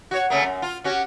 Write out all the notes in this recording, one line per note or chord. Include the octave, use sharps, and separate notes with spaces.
F#4 C#5
C#3 A3 A#3
F#2
F4
C#4 F#4 G4